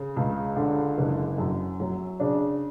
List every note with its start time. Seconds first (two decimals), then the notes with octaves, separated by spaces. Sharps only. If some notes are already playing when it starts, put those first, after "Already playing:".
Already playing: C#3
0.17 C#2
0.56 D3
0.98 F#1
1.38 F#2
1.80 F#3
2.20 C#3 D4